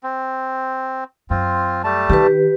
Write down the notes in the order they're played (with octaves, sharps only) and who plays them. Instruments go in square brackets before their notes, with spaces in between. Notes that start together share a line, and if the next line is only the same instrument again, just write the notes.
[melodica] C4
[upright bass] F#2 [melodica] C4 F4
[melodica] G3 A3 A5
[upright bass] D#3 [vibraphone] G4 B4